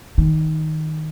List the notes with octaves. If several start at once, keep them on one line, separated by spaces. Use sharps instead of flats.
D#3